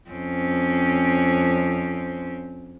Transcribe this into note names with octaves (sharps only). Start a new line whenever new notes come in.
F2 C4 C#4